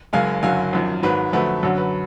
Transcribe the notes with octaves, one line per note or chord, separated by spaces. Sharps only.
F#1 F#2 C#3 G#3 F5 G#5
F#1 F#2 D3 F#3 F5 G#5
G#1 F#2 F3
G#1 G#2 F#3 B4
F2 D3 F#3 A3 B4
F#2 D3 F#3
B4